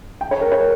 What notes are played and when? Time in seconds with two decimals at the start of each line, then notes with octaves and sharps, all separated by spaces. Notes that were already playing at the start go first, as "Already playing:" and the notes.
0.21 G5
0.31 C#5
0.41 A#4
0.52 C#5